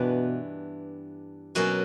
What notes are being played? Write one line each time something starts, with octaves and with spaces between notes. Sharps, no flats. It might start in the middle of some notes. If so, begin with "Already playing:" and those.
Already playing: G2 B2 E3 B3 D4
B2 F#3 A#3 C#4